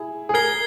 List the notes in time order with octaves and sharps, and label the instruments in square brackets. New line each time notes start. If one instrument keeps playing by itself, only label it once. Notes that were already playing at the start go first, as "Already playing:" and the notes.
Already playing: [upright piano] E4 G#4
G#4
[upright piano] A#4 [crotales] G#6 C7 G7